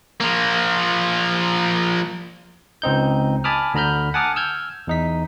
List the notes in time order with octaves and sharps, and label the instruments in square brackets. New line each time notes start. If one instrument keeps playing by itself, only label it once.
[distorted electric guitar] F3 A#3
[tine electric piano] C#2 C4 D#4 G6
G#5 A5 B5 D6 D#6 F6
D2 D3 A#5 B5 F6 G6
F#5 G#5 A5 D6 D#6 F6
E6 F6 G6 G#6
E2 D#4 B6